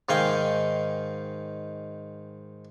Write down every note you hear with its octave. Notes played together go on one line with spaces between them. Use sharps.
G#2 D#3 F5 G5 G#5